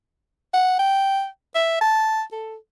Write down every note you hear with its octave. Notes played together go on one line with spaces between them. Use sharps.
F#5
G5
E5
A5
A4